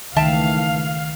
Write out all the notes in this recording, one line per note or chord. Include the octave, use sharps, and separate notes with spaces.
C#2 D#3 E3 A3 E5 F5 G5 A5